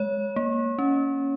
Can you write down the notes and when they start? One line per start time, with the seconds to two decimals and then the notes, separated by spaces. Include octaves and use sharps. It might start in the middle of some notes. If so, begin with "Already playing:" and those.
Already playing: G#3 C#5
0.36 A#3
0.79 C#4